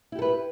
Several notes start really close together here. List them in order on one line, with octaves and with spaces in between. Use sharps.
E4 G4 A4 B4